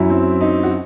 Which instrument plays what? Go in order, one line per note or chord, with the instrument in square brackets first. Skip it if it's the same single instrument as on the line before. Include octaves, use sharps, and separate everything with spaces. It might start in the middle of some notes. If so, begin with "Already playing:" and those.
Already playing: [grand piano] F#2 F#3 E4
C4
D#4
F#4